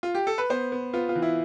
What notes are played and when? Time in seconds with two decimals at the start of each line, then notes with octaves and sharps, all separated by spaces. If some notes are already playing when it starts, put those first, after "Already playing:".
0.03 F4
0.15 G4
0.27 A4
0.38 B4
0.50 B3 C5
0.72 B3
0.93 B3 F4
1.09 F4
1.16 E3
1.22 E4